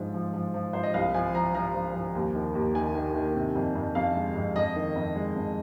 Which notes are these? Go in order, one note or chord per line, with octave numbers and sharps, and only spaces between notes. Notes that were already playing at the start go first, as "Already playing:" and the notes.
Already playing: G#2 F3
F3
F3
F3
F3 C5
D#5
C2 F5
F3 G#5
F3 A#5
F3 A#5
F3
F3
D#2
D#3
D#2
D#3 G#5
D#3
D#3
C3
F2
F2
F2 F5
G#3
F2
F2 D#5
D#3
F2
G#3
F2